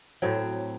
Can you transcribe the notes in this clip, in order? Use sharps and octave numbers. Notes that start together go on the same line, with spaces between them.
A2 F#3 C4